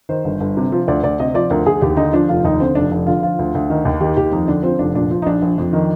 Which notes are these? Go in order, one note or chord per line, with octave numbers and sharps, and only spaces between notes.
D#3 C5
G1
G1
C3
F3
D2 D5
D2 D5
C3 D#5
F3 D5
D2 A#4
D2 G#4
D#2 G4
D3 D#4
F3 D4
F1 F4
D#2 D#4
D3 C4
F1 D4
F1
D3 F4
F3 F4
D2
D2
D#3
D#2
D#3 G4
D#2 G4
F2 D#4
D3 D4
F3 C4
F1 D4
A#2 D4
F3
D#4
A#1 D4
A#1
F2
D#3